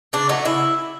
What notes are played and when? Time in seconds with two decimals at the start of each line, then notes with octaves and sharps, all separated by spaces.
0.13 C#3 D4
0.29 F#3 A3 D#4
0.45 C#3 E4